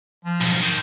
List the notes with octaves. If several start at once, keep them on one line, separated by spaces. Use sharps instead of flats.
F3
B1 F2
D#3 C5